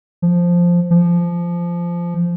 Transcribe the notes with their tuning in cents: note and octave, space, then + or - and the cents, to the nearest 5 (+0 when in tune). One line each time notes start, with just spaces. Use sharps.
F3 +0
F3 -15